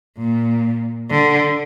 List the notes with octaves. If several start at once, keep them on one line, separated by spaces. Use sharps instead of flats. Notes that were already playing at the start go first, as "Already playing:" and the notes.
A#2
D3